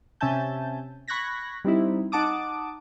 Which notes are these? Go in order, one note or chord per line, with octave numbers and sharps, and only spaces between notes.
C3 C#4 E5 G#5 A5 G6
B5 C#6 F#6 G#6 A#6 B6
G3 C4 D#4 E4
D#4 F#5 A5 D6 D#6